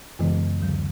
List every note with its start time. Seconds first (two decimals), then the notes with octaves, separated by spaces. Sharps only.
0.19 F#2 C#3 E3 G#3 B3
0.60 D2 D3 F#3